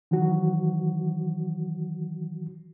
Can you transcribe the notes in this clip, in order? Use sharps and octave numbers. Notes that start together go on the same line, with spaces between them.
D#3 E3 F#3 F#4